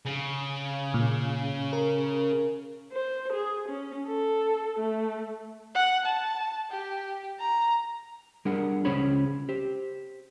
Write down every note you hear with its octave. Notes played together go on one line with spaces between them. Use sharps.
C#3
A#2
A#4
C5
G#4
C#4
A4
A3
F#5
A5
G4
A#5
G3 D4 G#4 A#4 F#5
C#2 C#4 G#4 C5 C#5 B5
G4 C5